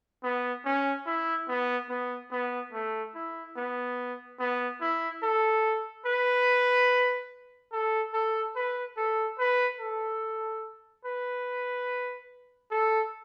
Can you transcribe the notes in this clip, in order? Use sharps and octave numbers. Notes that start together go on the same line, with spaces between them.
B3
C#4
E4
B3
B3
B3
A3
E4
B3
B3
E4
A4
B4
A4
A4
B4
A4
B4
A4
B4
A4